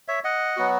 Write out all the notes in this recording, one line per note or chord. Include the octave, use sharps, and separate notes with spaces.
C#5 E5
D#5 F#5
F#3 B3 F#4